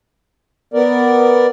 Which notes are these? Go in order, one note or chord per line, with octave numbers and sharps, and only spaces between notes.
B3 A#4 D5